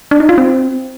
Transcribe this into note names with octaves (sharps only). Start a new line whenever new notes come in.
D4
D#4
F4
C4